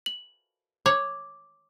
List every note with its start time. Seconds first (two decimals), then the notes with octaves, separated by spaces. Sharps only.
0.06 F#7
0.86 C#5 D6